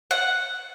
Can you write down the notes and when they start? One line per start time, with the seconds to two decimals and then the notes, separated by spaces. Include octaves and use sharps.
0.11 F#5